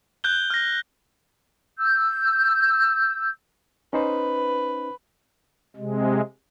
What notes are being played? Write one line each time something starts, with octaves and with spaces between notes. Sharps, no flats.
F#6 G6 G7
F6 A#6
E6 G6
C#4 D#4 B4 C5
C3 G#3